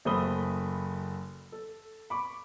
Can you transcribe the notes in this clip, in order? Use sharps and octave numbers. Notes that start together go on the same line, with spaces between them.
F#1 A3 C5 B5 D#6 G7
A4
B5 C#6 D6